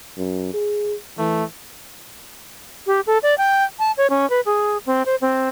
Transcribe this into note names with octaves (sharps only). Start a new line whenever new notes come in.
F#2
G#4
E3 A3
G4
A4
D5
G5
A5
C#5
C#4
B4
G#4
C4
C5
C4